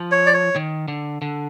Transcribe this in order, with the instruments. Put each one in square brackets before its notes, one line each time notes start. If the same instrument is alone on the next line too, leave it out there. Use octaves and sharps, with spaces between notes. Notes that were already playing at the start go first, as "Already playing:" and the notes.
Already playing: [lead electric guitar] F3
[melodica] C#5
D5
C#5
[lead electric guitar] D#3
D3
D3